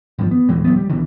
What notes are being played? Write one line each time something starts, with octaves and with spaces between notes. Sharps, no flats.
G#1 G2 E3 F3
B3
A#1 D#2 E3 G#3
D#1 F#3 B3
G3
B1 B2 D3 E3